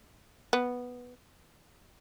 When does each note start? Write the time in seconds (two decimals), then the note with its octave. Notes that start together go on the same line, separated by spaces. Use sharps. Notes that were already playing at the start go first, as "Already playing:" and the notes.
0.53 B3